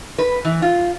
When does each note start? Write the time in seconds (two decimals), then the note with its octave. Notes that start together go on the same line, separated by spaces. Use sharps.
0.18 B4
0.45 E3
0.62 F4